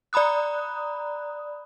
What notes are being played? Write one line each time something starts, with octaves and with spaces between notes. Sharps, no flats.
D5 A#5 B5 D#6 F#6